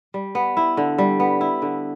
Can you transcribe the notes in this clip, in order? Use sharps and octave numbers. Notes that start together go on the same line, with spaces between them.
G3
B3
E4
D3
G3
B3
E4
D3